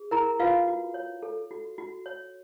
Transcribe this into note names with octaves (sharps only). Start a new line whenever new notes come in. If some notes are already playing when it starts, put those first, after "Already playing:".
Already playing: G#4
E4 A#4 A#5
F4 B4 F5
F#4
C#5
A4
F#4
F#4
C#5